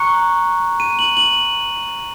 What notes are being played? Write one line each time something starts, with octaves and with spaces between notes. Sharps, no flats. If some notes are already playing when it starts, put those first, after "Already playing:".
Already playing: A#5 C#6 F#6 C#7
D#7
F#7
F#7